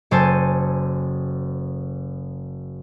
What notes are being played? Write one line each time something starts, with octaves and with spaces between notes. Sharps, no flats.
F#1 A4 C5 G#5 A5